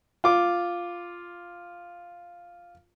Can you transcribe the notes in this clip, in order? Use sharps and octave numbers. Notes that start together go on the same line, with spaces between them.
F4 D6